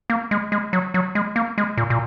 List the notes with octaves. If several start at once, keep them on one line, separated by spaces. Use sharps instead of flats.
A#3
G#3
G#3
F#3
F#3
G#3
A#3
G#3
A#2
A#2